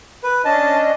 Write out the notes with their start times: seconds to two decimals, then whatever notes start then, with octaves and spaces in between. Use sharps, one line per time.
0.23 B4
0.45 C#4 D4 D#5 A5